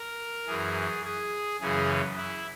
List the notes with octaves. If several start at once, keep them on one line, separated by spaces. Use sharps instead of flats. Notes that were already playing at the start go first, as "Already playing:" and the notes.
Already playing: A#4
F#2 E3 G#4
G#4
F#2 C#3 E3 G#4
E4